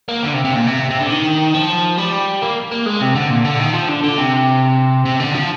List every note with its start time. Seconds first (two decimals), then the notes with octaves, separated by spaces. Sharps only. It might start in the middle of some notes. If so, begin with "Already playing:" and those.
0.09 A#3
0.23 D3
0.34 C3
0.45 C3
0.55 A#2
0.67 C3
0.91 C3
1.01 D3
1.11 D#3
1.55 F3
1.98 G3
2.42 A#3
2.71 A#3
2.86 G#3
3.01 C3
3.15 D3
3.30 A#2
3.45 D3
3.59 D#3
3.73 F3
3.89 D3
4.03 D3
4.17 C3
5.05 C3
5.20 D3
5.34 F3